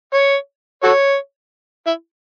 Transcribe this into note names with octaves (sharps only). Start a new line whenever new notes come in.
C#5
F#4 A4 C#5
E4